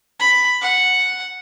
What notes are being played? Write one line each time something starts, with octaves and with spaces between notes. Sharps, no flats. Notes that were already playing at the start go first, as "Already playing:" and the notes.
B5
F#5